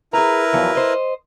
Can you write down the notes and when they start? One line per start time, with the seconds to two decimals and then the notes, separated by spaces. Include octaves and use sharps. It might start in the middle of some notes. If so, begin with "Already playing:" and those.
0.13 E4 G#4 A#4 B4 A#5
0.53 E2 F3 F#3
0.75 C5 D#5